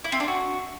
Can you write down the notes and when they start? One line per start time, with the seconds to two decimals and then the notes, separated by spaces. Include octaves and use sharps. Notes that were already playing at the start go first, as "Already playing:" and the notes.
0.04 E4
0.12 C4
0.20 D4
0.28 F#4